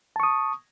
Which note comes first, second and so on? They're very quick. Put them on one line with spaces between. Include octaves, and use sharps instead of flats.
A5 C#6 D#6